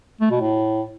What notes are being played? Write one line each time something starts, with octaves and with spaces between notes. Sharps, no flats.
A3
B2
A2